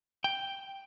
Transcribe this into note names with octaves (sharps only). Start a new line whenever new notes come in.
G5